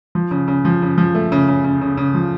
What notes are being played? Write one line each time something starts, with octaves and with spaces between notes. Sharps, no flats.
F3
C#3
C#3
F3
C#3
F3
A3
C#3
C#3
C#3
C#3
C#3
F3